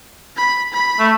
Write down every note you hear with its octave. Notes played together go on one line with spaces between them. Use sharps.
B5
B5
A3